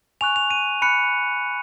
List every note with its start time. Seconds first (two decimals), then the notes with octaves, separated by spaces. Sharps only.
0.21 G#5 C#6 F#6 F7
0.36 F7
0.51 D#7
0.82 B5 F#6 C#7